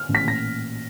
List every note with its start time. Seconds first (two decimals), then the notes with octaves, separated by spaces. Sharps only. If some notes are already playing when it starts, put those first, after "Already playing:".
Already playing: F6
0.09 A1
0.15 B6
0.23 A#2 A#6